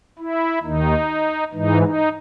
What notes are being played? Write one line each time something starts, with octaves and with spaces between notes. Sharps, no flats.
E4
D#2 D#3 D#4
G#2 E3 D#4
D#4